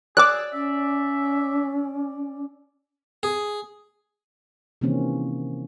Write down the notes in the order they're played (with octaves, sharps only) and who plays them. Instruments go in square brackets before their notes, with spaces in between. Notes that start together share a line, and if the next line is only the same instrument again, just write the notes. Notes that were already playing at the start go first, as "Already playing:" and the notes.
[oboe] G#4 [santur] D5 E6 [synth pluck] D6 F#6
[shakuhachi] C#4 [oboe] E5
[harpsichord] G#4
[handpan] C3 D#3 E3 A#3 C4 C#4